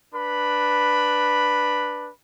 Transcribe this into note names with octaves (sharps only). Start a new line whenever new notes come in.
D4 B4 B5